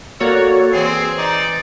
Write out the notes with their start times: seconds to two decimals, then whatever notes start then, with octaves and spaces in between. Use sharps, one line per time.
0.20 A#3 F#4 A4 C#5 D5 F#5
0.73 E3 C4 G#4 C7
1.18 D#4 D5